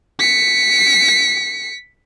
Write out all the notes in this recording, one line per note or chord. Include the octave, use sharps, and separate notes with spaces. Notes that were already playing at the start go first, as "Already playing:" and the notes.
B6 C#7